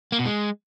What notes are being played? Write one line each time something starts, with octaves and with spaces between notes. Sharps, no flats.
A#3
B2
G#3